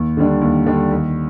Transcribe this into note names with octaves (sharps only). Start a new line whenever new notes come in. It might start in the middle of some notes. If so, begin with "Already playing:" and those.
Already playing: D#2
D3 G3 D4
D#2
D3 G3 D4
D#2